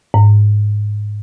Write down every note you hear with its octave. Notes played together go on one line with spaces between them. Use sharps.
G#2